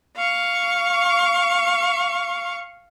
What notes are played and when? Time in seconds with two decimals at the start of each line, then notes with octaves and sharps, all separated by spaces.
0.17 F5 C#6